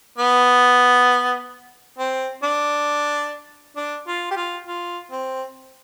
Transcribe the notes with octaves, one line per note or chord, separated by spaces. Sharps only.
B3
C4
D4
D4
F4
G4
F4
F4
C4